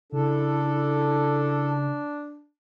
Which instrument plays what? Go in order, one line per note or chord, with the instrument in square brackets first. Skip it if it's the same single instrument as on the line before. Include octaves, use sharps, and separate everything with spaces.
[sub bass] C#3 [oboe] D4 [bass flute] E4 [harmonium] A4